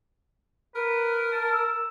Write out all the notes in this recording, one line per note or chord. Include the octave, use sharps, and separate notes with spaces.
A#4 B4
A5
E6